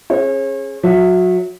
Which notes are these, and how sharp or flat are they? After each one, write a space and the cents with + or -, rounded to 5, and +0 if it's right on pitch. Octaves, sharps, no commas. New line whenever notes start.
C#4 -35 G#4 +0 C#5 -40
F#3 -25 E5 +0